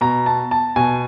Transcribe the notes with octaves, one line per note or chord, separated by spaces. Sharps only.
B2 A#5
A5
A5
B2 G#5